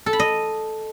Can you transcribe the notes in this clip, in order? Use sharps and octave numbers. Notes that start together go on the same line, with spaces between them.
A4
B5
D#5